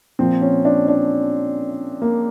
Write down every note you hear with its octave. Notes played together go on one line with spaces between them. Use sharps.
A#2 F3 C4
C#4
D4
D4
A#3